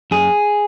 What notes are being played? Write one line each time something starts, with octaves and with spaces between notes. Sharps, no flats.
F#2 G#4